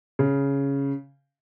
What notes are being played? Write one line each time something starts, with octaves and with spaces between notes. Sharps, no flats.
C#3